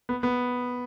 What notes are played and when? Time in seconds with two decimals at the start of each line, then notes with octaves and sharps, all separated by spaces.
0.09 B3
0.23 B3